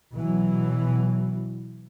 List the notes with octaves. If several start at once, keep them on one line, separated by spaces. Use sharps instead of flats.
B2 E3 F#3